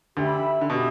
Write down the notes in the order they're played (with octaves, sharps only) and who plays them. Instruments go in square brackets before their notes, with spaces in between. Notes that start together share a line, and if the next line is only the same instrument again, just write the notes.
[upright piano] D2 D3 [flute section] G4 E5 B5
[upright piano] D3
[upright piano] B2 [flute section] G4 E5 B5